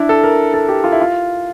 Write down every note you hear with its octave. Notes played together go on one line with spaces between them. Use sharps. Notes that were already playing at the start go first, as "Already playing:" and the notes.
Already playing: D4 E4
A4
A#4
A4
G4
F4
E4
F4